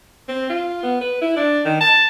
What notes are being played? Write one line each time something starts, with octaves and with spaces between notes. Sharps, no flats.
C4
F4
B3
B4
E4
D4
D#3
A5